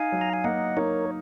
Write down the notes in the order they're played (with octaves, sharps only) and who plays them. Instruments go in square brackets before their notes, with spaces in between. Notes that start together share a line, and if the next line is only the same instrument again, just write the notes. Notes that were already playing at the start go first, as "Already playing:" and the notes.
Already playing: [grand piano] D#4 [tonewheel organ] F5 G#5
[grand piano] F#3
[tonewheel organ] A#5
G#5
[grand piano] A#3 [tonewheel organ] D#5 F#5
[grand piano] D#4 [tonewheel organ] A#4 C#5